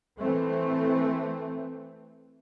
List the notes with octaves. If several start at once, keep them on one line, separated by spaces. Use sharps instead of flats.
E3 A3 C4